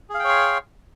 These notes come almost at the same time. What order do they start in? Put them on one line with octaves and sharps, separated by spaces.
G#4 F5 G5 C#5 C6